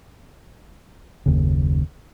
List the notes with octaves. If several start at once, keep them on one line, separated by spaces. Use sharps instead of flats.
F#1 D#2 C#3